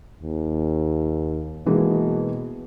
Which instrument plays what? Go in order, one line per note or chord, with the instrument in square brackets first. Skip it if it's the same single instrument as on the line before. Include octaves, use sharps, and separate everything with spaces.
[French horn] D#2
[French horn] B2 [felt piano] E3 G#3 A#3